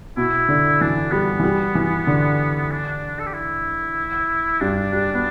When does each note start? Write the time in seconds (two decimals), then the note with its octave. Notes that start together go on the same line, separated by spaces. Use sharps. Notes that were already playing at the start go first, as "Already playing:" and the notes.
0.17 B2 E4
0.49 D3
0.81 E3 D4
1.12 G3 B3
1.40 E3
1.44 G3
1.75 E3
2.07 D3
2.71 D4
3.20 A4
3.27 G4
3.34 E4
4.60 G2 D4
4.93 G3
5.14 B3